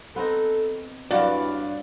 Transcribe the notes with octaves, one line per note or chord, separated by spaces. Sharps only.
B3 C4 D#4 A4
G2 E3 F#3 G4 D5 F5 F#5